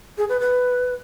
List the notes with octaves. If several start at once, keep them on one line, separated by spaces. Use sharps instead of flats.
G#4
B4
B4